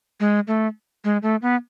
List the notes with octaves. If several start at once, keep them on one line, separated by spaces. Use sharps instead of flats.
G#3
A3
G#3
A3
B3